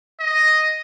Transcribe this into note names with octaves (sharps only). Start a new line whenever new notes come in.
D#5